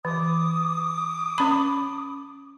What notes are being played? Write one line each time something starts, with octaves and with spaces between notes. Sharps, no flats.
E3 D6 D#6
C#4 B5